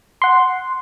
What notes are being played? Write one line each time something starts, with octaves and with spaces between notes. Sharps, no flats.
F#5 C6